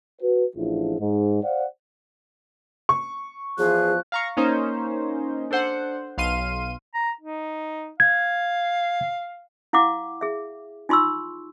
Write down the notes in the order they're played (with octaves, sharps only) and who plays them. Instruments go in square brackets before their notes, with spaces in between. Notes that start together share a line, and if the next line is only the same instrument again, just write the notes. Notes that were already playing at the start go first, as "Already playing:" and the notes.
[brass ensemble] F#4 B4
A1 F3 D4 E4 F4 G#4
G#2
C5 D5 F5 F#5
[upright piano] C#6
[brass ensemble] E2 F3 [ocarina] G#4 [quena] F#6
[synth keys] F5 A#5 C#6
A#3 C#4 D#4 C5
D4 A4 C5 F#5
B1 F5 C6 D#7
[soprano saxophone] A#5
D#4
[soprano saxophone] F5 [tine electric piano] G#6
[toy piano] E4 F5 F#5 D6
G#4 E5
D#4 F4 C6 C#6 E6